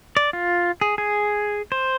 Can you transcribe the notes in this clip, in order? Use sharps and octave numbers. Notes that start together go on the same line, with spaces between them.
D5
F4
G#4
G#4
C5